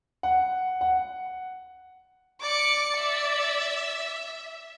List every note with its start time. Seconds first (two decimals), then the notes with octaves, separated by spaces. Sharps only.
0.23 F#5
0.81 F#5
2.42 D5 D6 C#7
2.99 E5